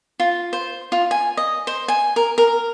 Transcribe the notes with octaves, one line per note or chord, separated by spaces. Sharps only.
F4
C5
F4
G#5
D#5
C5
G#5
A#4
A#4